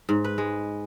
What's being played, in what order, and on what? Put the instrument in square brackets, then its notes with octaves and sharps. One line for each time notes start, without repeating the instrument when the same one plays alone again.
[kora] G#2
B4
G#3